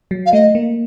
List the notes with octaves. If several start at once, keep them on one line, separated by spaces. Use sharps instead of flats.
F#3
F5
A3 D#5
A#3